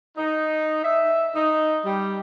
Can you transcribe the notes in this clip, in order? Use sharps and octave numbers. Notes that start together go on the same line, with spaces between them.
D#4
E5
D#4
G3